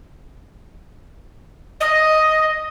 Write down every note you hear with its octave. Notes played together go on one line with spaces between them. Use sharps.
D#5